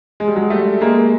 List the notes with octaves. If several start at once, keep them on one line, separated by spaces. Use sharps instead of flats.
G#3
G3
F#3 G#3
G3 A3
G#3 A#3